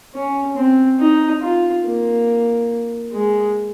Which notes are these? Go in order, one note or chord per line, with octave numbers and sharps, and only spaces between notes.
C#4
C4
D#4
F4
A#3
G#3